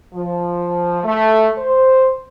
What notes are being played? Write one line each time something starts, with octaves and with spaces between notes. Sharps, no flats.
F3
A3
C5